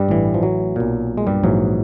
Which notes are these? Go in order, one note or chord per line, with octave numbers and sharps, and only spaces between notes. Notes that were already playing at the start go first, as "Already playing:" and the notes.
Already playing: G2 G3
A1 A2 E3
F3
F#3
B1 A#2
G#3
G2 G3
A#1 G#2 E3 F#3